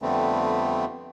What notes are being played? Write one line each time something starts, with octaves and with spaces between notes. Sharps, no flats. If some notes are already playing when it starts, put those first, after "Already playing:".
F2 D3 G3 A3 B3 C4